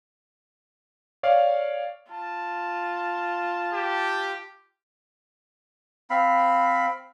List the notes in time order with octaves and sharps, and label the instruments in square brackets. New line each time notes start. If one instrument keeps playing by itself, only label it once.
[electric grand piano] C#5 D5 F5
[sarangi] F4 [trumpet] A5
[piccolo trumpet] G4
[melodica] C4 F5 B5